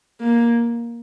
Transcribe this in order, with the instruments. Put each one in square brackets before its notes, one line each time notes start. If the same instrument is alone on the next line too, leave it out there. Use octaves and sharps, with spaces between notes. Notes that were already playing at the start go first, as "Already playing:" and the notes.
[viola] A#3